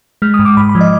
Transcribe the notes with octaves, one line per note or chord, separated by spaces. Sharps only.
G#3 F6
D#6
G#2
D6
G#2 B5
B5
F3
D#5